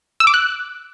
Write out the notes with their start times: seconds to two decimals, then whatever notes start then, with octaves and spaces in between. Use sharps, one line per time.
0.20 E6
0.27 D6
0.34 F#6